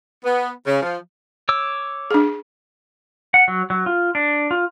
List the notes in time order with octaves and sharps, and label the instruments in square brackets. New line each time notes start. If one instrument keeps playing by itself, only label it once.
[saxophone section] B3
C#3
F3
[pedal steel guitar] C#5 D6 E6
[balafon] D4 G#4
[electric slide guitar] F#5
F#3
F#3
F4
D4
F4